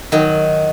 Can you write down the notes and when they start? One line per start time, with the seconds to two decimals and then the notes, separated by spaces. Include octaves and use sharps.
0.12 D#3 F#3